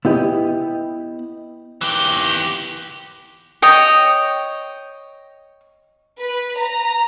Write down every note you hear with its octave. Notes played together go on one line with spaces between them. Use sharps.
B3 E4 G4 D#5
E3 G4
C#5 D#5 G5
B4
A#5